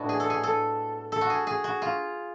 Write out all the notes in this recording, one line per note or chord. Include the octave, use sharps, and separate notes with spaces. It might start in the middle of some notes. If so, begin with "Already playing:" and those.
Already playing: A2 G#3 B3 D4 F#4
G#4
A4
G#4
A4
A4
F#4
G#4
G#4
F#4
F4